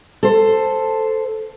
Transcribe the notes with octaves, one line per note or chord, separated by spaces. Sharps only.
A4 C5